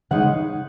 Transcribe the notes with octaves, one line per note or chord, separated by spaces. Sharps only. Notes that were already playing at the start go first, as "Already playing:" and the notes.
C#3 G#3 D#4 F#5